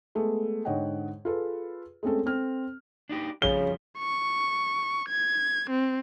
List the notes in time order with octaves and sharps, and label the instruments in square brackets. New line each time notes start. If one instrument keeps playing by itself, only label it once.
[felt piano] G#3 A3 B3
G#2 D3 C#5 D#5 F#5 G5
F4 G#4 A4 B4
G#3 A3 C4 C#4 A4
C4 A4 F6
[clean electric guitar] D4 D#4 G4
[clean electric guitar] F2 F3 G3 [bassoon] C#3 [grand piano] G7
[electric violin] C#6
G#6
C4